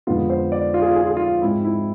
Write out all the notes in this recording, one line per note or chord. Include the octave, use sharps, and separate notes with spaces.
F2 D3 G#3 B3 F4
C5
D5
F4
G#4
F4
G#4
F4
G#4
F4
G#2 G#3 C4 E4
E4